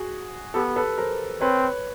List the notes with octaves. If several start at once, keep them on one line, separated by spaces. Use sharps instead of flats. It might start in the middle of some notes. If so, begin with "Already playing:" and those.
Already playing: F#4 G#4
B3 G4 A4
A4 B4
A#4 C5
C4 B4 C#5